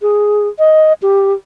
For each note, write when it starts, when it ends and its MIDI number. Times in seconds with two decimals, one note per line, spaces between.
0.02 0.48 68
0.59 0.93 75
1.02 1.33 67